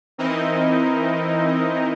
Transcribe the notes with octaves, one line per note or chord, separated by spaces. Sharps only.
E3 C4 D#4 E4 A#4 D#5